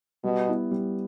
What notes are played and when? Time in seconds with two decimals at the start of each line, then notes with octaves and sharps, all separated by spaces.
0.24 B2 G3
0.48 B3 E4
0.71 G3